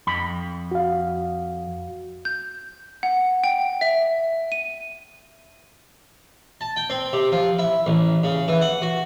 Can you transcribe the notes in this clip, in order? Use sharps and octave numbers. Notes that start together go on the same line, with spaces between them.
F2 B5
F#4 F5
G6
F#5
G5
E5
D#7
A5
G5
C4
C3
F3
E4
A1
C#3
E3
F#5
F#4